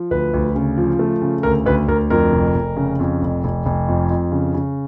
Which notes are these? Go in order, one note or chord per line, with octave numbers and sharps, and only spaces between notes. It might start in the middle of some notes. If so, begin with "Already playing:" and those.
Already playing: F3
D2 B4
D2
C#3
F3
A3
C#3
D2 A#4
D2 B4
D2 A#4
F2 A#4
F1
F1
C#3
F2
F1
F1
F1
F2
F2
C#3
C#3